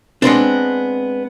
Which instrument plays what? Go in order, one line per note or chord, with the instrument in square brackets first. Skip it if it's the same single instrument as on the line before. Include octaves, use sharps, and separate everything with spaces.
[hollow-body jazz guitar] G#3 B3 C4 D4